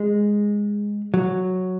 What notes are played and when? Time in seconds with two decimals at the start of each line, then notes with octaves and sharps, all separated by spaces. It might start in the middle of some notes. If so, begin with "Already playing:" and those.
Already playing: G#3
1.14 F#3